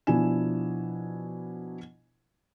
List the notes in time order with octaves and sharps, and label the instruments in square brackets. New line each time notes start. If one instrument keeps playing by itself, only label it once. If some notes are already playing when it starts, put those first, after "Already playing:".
[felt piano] B2 F3 D4 E4 G#5 E7